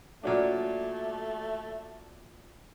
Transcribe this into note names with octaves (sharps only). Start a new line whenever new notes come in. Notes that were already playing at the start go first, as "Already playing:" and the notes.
A#2 F#3 A3 D4